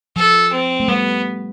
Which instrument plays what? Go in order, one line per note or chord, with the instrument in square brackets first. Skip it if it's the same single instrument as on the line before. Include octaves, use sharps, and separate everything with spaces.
[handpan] F3 [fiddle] A4
[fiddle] C4
[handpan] A3
[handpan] G3 [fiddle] B3